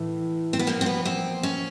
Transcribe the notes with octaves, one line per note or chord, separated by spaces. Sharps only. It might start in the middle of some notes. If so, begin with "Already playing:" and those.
Already playing: A2 E3
C4
B3
A#2 F3 A#3
C4
B3
C4
C#4